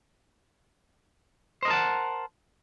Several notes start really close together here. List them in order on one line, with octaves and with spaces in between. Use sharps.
C5 D#5 A#4 A5 F#5